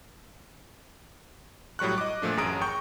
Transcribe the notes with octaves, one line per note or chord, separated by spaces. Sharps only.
A2 F#3 G3 C#6 F#6
D#5 D6
A#2 F3 A3 D4
A1 F#2 G#4 A#5 D#6 D7
G5 A#5 C#6 G6